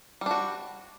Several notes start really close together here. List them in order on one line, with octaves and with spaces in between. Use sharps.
G3 D4 F#4